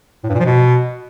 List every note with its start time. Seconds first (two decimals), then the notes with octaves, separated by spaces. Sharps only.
0.24 A2
0.29 G2
0.34 A#2
0.40 F3
0.45 B2